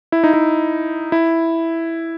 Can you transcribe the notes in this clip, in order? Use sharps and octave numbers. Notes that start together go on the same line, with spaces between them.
E4
D#4
E4
E4